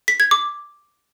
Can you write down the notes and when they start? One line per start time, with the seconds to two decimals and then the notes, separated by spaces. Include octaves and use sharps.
0.08 B6
0.20 G#6
0.31 D6